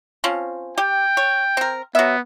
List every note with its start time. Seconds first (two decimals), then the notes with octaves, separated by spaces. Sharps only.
0.24 F3 C4 C#4
0.78 G4 G5
1.17 C#5
1.57 C4 A#4
1.95 F#3 B3 E5